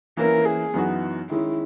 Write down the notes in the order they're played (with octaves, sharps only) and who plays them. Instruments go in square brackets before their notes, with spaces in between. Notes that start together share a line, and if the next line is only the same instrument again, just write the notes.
[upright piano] E3 A#3 C#4 E4 B4 [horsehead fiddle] A#4
[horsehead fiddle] G#4
[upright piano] F#2 E3 B3 D#4 F#4
[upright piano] D#3 G#3 C#4 [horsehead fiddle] E4